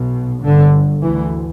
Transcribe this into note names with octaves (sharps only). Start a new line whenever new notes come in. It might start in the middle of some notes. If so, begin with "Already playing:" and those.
Already playing: B1 B2
G1 G2 D3
D2 E3